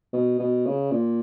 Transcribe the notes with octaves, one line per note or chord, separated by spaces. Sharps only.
B2
B2
C#3
A#2